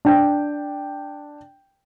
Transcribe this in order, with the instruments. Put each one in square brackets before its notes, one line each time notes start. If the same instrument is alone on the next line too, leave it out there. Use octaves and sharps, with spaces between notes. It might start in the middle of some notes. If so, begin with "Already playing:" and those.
[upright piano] D4 G5